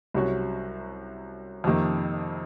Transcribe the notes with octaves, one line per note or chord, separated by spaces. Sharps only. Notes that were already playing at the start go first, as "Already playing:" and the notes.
C2 C3 F#3 C#4 F#4
F2 C3 D#3 A#3